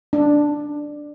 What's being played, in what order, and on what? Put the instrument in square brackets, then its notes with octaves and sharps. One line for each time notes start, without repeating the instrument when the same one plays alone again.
[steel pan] D4